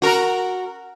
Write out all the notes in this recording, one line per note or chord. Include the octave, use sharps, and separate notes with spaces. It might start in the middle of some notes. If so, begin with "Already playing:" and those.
F#4 A#4